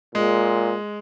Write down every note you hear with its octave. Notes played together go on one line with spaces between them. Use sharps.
A#2 G#3